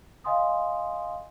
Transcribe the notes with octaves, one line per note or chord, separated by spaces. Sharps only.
D#5 F5 G#5 C6 D#6